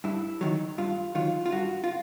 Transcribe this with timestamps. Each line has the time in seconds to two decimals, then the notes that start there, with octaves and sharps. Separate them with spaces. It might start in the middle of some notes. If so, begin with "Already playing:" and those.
0.04 G2 E4
0.41 D#3 F#3
0.78 G2 F4
1.15 D#3 F#3 F4
1.46 F4
1.52 G2 F#4
1.84 F4